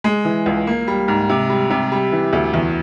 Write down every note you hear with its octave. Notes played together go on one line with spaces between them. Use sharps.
G#3
E3
C#2
A#3
G3
G#2
C3
G3
C3
G3
E3
D2
E2